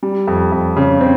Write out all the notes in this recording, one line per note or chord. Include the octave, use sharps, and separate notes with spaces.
G3
F2
F2
C#3
C4